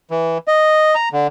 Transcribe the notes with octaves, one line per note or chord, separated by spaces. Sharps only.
E3
D#5
A#5
D3